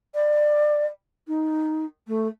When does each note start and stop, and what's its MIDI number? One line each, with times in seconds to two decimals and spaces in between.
0.14 0.86 74
1.27 1.84 63
2.07 2.27 57